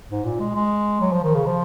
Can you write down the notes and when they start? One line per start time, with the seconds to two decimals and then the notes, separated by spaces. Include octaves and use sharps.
0.10 G#2
0.25 A#2
0.39 G#3
0.55 G#3
1.01 F#3
1.12 F3
1.24 D#3
1.35 C#3
1.47 F3